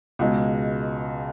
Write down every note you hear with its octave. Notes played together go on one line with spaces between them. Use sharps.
C#2 B2 G#3